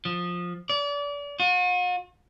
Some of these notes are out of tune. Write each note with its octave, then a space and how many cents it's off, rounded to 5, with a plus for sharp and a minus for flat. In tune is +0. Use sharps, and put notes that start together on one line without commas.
F3 +10
D5 -35
F#4 -45